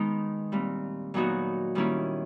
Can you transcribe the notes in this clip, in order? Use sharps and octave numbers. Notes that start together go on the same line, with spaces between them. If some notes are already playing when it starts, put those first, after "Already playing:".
Already playing: D#3 G#3 B3 D#4
A#2 G3 C4
A#2 F#3 B3 D#4 F#4
D#3 G3 A#3 C#4 E4